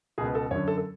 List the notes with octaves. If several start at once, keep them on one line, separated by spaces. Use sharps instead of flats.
C#2 B2 G#4
B4
A4
F#2 D3 C#5
A4
A4